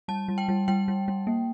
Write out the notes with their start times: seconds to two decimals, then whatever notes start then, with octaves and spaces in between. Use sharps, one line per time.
0.08 G3 A5
0.28 G3
0.38 G5
0.48 G3
0.68 G3 G5
0.88 G3
1.08 G3
1.27 A#3